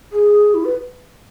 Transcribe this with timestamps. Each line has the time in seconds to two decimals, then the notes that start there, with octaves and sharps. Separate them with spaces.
0.13 G#4
0.54 E4
0.65 B4